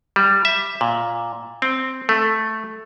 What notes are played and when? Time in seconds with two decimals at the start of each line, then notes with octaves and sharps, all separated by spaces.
0.16 G3
0.45 E5
0.81 A#2
1.62 C4
2.09 A3